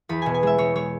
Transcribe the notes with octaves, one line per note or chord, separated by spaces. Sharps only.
E2 B5
B2 G#5
G#5
G#3 E5
G#3 C#5
G#3 C#5